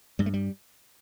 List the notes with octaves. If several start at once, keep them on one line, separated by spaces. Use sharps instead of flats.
G2 G3
A3
G3